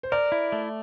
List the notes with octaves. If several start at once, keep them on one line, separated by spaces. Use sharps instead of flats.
C5
A#4 D5
E4
A3